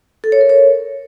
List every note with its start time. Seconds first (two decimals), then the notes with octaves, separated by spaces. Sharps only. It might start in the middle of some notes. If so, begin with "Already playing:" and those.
0.24 A4
0.32 C#5
0.41 A#4
0.49 C#5